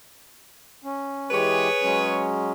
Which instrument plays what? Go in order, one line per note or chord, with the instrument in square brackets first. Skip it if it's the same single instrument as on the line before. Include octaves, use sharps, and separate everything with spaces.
[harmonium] C#4
[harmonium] E3 G#3 G4 [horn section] G#4 B4 C#5
[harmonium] F#3 G#3 C#4